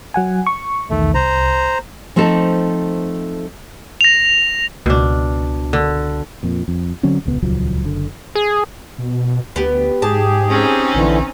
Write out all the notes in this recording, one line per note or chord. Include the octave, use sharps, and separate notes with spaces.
F#3 F#5 G#5
C#6
B1 E2 D#3 A3
C2 C5 A#5
F3 A3 C4 D#4 A4
A#6 F7
C#2 B2 D4
D3
F2 A#2
F2
D3 F#3 C4 C#4
D#1 C#2 B3
D#1 C#2 F3 F#3
F#1 D3
G#4
B2
D2 B3 G4
G#2 G4 G#4 A5
C4 C#4 D#4
A#1 D3 E3